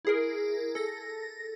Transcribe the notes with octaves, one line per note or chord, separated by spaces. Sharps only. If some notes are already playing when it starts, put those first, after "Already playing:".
E4 G#4 A#4
A4 A#6